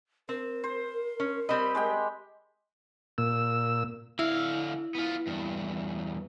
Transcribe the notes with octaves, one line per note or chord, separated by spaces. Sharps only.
C4 A#4
C5
C#4
G3 C4 D#5 B5
G#3 G4 G5
A#2 E6
D3 E4 F5
B3 F4
E2 G2